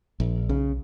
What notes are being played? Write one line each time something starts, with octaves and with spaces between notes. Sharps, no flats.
A#1
B1 C#3